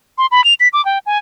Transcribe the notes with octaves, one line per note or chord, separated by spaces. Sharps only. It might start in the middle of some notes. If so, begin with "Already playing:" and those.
C6
B5
F7
B6
D6
G5
G#5